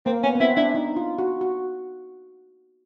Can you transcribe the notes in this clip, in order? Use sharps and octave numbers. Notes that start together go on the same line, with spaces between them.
A#3 C4
B3 C#4
B3
C4 E4
D4 E4
D#4
F4
F#4
F#4